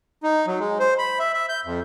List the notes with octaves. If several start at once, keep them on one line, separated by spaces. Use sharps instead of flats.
D#4
F#3
G#3
C5
B5
E5
E5
G6
F2